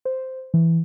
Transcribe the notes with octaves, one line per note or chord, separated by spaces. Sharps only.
C5
E3